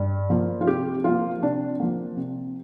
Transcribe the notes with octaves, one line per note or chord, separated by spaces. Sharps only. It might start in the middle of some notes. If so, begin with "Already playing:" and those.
Already playing: G2
F3 A#3
F4
C3 G4
F3 A#3 F4
C3 D4
F3 A#3
C3